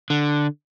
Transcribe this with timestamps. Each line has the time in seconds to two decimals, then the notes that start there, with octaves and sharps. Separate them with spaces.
0.10 D3